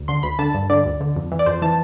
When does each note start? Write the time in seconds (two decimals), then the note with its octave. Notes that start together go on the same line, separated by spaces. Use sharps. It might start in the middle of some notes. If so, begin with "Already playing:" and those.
Already playing: D2
0.08 D3 C6
0.23 D2 B5
0.39 D3 A5
0.54 G2
0.70 D3 D5
0.85 D2
1.00 D3
1.16 F2
1.32 E3
1.39 D5
1.46 F2 C5
1.62 E3 A5